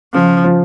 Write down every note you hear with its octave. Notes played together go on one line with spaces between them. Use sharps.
C#3 F3
F3